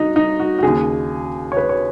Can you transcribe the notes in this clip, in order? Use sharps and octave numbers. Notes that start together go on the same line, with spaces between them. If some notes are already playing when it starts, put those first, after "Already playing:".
Already playing: D#4 F#4
D#4
F#4
F#4
D#2 C#3 G#4
C#5
B4
C#5